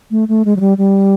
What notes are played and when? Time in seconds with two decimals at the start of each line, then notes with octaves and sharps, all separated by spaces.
0.11 A3
0.28 A3
0.45 G#3
0.56 F#3
0.60 G3
0.78 G3